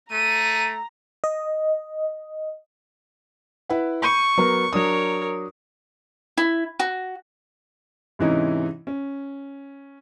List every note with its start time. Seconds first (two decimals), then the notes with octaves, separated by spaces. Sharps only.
0.12 A3 A#5 D#7
1.24 D#5
3.69 E4 B4 F#5
4.02 B5 C#6 G6 D#7
4.38 F#3 B3 A#4
4.73 F#3 D4 A#4 C#5 D#6
6.37 E4
6.79 F#4
8.19 G#2 C3 E3 C#4 D#4 E4
8.87 C#4